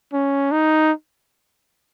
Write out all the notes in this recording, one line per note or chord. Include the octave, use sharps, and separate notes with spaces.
C#4
D#4